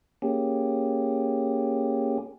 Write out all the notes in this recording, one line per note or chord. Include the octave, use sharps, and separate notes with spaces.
A#3 C#4 G4 G#4